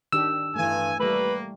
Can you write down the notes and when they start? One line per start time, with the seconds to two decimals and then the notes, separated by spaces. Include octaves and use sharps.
0.13 D#3 D4 G4 E6
0.56 G2 E3 A3 G#5
1.00 G3 A3 A#3 B4